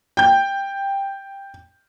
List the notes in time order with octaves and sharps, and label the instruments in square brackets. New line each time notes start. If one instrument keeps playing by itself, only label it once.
[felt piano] G5 G6